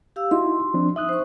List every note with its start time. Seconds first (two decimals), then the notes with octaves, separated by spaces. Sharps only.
0.16 G4 F5 E6
0.31 D#4 E4 F#4 C6
0.74 F3 C4 D4
0.96 D#4 E5 D#6 F#6
1.09 C5 C#6